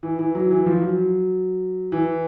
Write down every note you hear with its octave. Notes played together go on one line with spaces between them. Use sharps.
E3
E3
F#3
E3
F3
F#3
E3